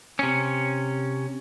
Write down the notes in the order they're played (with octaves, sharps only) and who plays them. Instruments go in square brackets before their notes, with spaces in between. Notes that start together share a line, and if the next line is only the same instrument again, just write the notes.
[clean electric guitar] C3 C#4